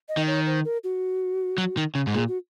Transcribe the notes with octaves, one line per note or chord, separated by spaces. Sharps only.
D#5
D#3
C#5
C5
A#4
F#4
F#3
D#3
C#3
G#2
A#2 G#4
F#4